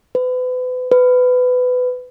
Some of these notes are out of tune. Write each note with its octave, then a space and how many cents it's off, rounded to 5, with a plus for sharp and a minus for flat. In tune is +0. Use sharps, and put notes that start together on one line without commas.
B4 +35
B4 +20